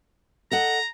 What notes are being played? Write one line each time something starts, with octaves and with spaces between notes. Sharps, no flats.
A4 D#5 F#5 A#5